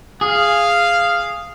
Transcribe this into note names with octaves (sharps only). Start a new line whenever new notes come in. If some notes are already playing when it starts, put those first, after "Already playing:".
G#4 F5